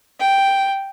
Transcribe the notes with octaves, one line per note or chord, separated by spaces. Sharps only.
G5